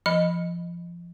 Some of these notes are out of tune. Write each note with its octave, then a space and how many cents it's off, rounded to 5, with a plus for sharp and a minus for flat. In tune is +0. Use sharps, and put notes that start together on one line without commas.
F3 -25 D#5 +0 B5 +0